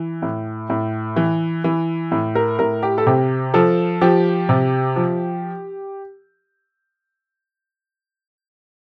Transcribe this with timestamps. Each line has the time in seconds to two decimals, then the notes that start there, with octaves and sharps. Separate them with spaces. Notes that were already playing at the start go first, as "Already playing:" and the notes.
Already playing: E3
0.22 A2
0.70 A2
1.16 E3
1.64 E3
2.11 A2
2.35 A#4
2.59 A2 A#4
2.83 G4
2.98 A4
3.07 C3 G4
3.54 F3 A4
4.01 F3 G4
4.49 C3
4.96 F3